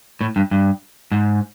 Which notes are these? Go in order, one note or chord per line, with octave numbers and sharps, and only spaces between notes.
A2
G2
G2
G#2